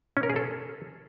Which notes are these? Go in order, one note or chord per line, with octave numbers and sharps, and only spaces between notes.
C#4
A#4
G#4
A4